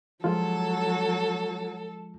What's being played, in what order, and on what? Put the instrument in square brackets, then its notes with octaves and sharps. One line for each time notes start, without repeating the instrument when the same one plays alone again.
[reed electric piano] F3 G#3 F4 [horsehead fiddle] F#3 [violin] A4